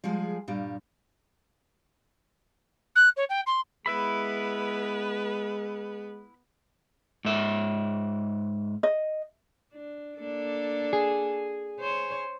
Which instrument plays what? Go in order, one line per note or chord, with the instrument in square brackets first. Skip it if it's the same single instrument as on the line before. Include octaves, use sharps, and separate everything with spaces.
[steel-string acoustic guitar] F3 G3 G#3 G#4
G2 A#2 G3
[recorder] F#6
C#5
G5
C6
[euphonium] G#3 [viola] B3 B4 [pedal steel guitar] E4 E5 B5
[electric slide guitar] G#2 E5
[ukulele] D#5
[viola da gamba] D4
A#3 D4 A4
[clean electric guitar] G#4
[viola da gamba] C5 C#5